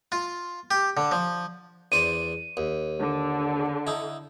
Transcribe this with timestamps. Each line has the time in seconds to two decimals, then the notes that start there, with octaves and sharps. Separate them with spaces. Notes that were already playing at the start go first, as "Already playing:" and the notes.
0.12 F4
0.71 G4
0.97 D3
1.11 F3
1.92 E2 D4 C5 D#7
2.57 D#2
2.99 D3
3.87 D#4 E4